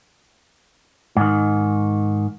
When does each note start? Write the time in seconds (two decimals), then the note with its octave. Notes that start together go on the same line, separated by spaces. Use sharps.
1.17 G#2 D#3